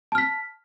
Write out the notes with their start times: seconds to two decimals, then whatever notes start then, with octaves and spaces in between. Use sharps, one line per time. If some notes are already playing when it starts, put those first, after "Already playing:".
0.12 A5
0.15 F6
0.18 B6